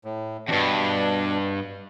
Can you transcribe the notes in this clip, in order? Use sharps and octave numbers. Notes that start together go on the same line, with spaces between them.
A2
E2 G2 B2 D4